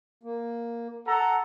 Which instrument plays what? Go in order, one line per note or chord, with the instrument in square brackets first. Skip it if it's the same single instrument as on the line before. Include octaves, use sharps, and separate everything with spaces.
[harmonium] A#3
[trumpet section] A4 A#5 [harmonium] F#5